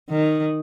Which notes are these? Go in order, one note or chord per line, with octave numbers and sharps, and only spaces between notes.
D#3